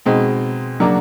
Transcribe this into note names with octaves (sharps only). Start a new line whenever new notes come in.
B2 G#3 C4 D#4
C#3 F#3 A#3 D4 F#4